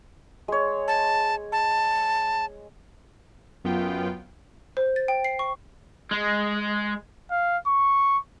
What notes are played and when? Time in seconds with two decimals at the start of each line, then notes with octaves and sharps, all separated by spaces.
0.48 G#3 C#5
0.88 A5
1.52 A5
3.64 F#2 B3 F4 G5
4.77 C5
4.96 A6
5.08 G5
5.24 C7
5.39 C#6
6.11 G#3
7.31 F5
7.67 C#6